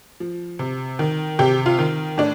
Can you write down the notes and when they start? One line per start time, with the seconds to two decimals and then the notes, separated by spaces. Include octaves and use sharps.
0.20 F3
0.59 C3
0.99 D#3
1.39 C3 G4
1.66 F4
1.79 D#3
2.18 A2 D4